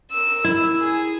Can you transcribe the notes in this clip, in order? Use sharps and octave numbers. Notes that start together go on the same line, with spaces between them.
A#4 E6
E4
G#4